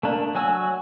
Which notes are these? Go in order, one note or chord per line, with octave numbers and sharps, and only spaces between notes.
A3 A#3 D4
F#3 F#4 G#5 E6